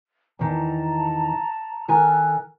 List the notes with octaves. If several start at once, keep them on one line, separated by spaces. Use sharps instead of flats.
E2 D#3 A5 A#5
D#3 A4 G#5 A#5 F6 F#6